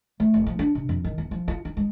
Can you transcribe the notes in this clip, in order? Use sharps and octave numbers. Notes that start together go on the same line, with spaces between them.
A3
F1
F3
D4
C3
F2
D#3
E2
F3
F4
D#4
G#3